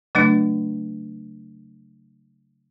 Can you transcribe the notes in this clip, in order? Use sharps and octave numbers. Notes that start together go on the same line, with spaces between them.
C#3 F#3 A3 D4